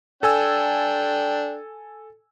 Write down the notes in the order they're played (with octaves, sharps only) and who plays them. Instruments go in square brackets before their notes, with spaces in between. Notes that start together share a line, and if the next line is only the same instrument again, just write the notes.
[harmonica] D4 G5 [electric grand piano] A4 G#5 E6